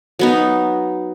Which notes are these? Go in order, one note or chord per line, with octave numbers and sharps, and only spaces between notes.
F#3 B3 D#4